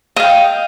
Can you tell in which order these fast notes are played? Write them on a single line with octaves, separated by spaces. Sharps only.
D#5 F5 G5